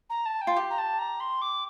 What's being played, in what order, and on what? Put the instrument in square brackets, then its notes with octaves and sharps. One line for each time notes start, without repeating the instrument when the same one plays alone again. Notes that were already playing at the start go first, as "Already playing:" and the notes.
[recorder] A#5
A5
G5
[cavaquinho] F4
G4
[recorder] A#5
A5
A#5
C6
D6